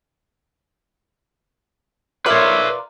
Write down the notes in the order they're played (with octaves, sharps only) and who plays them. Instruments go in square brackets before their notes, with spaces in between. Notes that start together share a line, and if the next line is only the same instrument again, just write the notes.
[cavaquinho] F4 A#4 D5 [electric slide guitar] B4 C#5 [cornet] E5